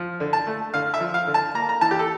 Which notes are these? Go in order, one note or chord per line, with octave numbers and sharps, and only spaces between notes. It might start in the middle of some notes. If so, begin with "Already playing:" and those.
Already playing: F3
D3
A5
A3
D3 F5
E5
F3
F5
D3
A5
A#3 A#5
A#5
E3 A5
G4
A4